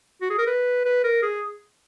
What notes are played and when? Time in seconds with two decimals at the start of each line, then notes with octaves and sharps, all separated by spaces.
0.21 F#4
0.30 G#4
0.38 A#4
0.47 B4
0.85 B4
1.04 A#4
1.22 G#4